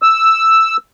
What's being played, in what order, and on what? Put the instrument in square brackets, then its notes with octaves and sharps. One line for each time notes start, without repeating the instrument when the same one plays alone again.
[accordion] E6